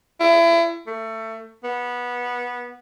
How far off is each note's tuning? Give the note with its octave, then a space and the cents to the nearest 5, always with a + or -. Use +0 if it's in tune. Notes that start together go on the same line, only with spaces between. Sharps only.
E4 +30
A3 +25
B3 -15